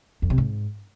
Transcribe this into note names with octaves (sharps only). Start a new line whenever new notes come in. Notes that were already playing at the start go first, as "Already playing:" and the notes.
F2
C3
G#2